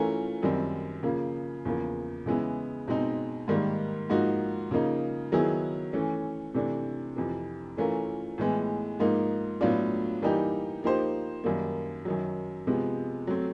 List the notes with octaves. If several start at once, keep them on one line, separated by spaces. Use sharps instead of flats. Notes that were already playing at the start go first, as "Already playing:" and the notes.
Already playing: E3 A3 C#4 F4 A#4
F#2 D#3 G3 C4
C#3 F3 A#3
E2 C#3 F3 A#3
C#3 E3 G#3 B3 E4
B2 G#3 C4 D#4
G#2 D#3 G3 A#3
G#2 F3 A#3 D#4 F#4
C#3 F3 A#3 D#4
D#3 F#3 B3 E4 G#4
E3 A3 C#4
C3 E3 A3 D4
F2 C3 E3
E3 A3 C#4 F4 A#4
A2 E3 G#3 B3
G#2 F3 A#3 D#4
A2 F#3 B3 D4 F4
E3 G3 A#3 D#4 G4
F3 A#3 D#4 G4 C5
F#2 D#3 G3 A#3
F#2 D#3 F#3
C3 F3 G#3 B3
F#3 A3 C4